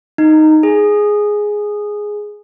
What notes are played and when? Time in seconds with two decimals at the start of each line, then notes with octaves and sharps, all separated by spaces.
0.18 D#4
0.63 G#4